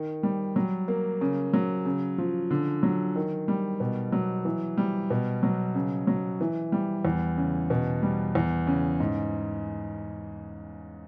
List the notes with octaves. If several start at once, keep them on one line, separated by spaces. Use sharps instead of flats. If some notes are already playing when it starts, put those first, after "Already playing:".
Already playing: D#3
G3
F#3
A#3
C#3
F#3
C#3
F3
D3
F#3
D#3
G3
B2
F#3
E3
G3
B2
F#3
C#3
F#3
E3
G3
E2
C#3
B2
G3
E2
C#3
G#2